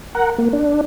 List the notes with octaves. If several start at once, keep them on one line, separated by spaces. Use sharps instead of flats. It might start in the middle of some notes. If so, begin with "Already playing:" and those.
A#4 F#5
A#3
D4